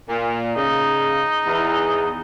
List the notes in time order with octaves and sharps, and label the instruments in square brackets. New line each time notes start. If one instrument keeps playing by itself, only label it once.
[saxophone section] A#2
[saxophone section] C#3 [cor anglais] D#4
[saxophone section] E2